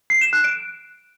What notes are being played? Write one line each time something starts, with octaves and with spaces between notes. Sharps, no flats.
C7
E7
F#6
D7